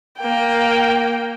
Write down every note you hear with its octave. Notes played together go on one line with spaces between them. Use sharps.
A#3 G5